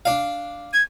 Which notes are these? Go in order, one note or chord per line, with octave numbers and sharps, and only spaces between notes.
D4 F5
G#6